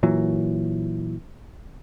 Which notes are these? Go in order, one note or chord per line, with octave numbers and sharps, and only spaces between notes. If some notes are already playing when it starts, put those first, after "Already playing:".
A#2 E3 F#3